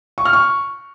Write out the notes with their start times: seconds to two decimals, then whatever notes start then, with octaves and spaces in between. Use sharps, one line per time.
0.18 C#6
0.25 F6
0.33 C#6